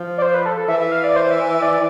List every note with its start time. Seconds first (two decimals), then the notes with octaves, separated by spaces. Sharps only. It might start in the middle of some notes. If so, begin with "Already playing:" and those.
Already playing: F3
0.18 D5
0.22 C5
0.34 B4
0.46 A4
0.57 A4
0.69 E3 E5
0.80 E5
0.92 F5
1.04 D5
1.16 C5
1.31 E5
1.50 E5
1.62 D5